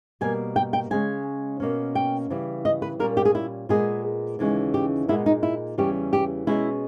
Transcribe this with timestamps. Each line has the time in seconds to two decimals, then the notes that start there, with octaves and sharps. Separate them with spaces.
0.21 B2 G3 A#3 G#5
0.56 G5
0.73 G5
0.90 C#3 G#3 C#4 G#5
1.60 B2 A#3 C#4
1.95 G5
2.30 C#3 E3 G3
2.65 D#5
2.82 B4
2.99 A#2 G3 C#4 A#4
3.17 G4
3.25 G#4
3.35 E4
3.69 A#2 G#3 B3 G#4
4.39 D#2 C#3 E3 G#3 C#4
4.74 G4
5.08 A#2 G#3 B3 E4
5.26 D#4
5.43 E4
5.78 E2 C#3 E3 G3 C#4 G4
6.13 G4
6.47 B2 G#3 C#4 E4